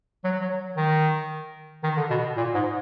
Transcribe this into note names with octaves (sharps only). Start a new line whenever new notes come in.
F#3
F#3
D#3
D#3
D3
B2
A#2
G#2